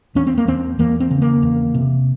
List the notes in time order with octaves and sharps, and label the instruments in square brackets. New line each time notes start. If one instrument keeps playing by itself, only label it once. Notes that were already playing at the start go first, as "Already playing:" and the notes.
[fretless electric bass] E2 C#4
C4
A#3
E2 C4
E2 A#3
C4
C#3
A#3
E2
C3